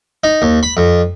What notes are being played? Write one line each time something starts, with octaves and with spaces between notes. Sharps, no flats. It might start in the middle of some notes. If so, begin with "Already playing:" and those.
D#4
D#2
B5
F2